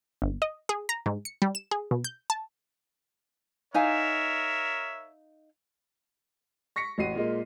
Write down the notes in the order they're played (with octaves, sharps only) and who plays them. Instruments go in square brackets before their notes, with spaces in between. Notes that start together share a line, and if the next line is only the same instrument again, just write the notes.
[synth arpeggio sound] G1
D#5
G#4
A#5
G#2
C#7
G3
E7
G#4
B2
G6
A5
[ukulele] D#4 F5 G#5 [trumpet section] A#4 C#5 E5
[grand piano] C#6 A#6 B6 C#7
A1 F#4 C7 D#7
A#2 G#3 A#3